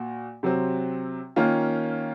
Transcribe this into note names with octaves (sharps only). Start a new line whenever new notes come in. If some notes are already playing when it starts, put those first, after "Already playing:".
Already playing: A#2 F#4
C3 F#3 C4
D#3 A#3 C#4 F4